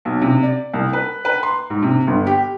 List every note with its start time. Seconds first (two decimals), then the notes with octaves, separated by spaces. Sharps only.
0.05 B1
0.22 C3
0.43 D5
0.73 C2
0.93 B4
1.25 B4
1.43 C6
1.70 G#2
1.82 C3
2.07 G1
2.27 G4